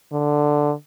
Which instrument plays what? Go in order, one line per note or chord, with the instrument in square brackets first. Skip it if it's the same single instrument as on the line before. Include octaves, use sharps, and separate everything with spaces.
[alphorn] D3